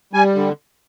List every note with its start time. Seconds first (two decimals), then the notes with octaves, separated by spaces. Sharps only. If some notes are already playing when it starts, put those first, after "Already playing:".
0.13 G3 G#5
0.35 D3